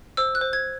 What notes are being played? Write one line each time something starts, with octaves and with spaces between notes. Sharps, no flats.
C5 E6
F#6
C5
G#6